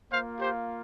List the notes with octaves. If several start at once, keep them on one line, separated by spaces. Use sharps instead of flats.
A#3 F4 C5 F5
G4 C5